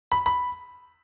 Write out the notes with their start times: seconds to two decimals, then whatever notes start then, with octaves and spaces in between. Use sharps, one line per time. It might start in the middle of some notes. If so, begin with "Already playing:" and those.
0.12 B5
0.26 B5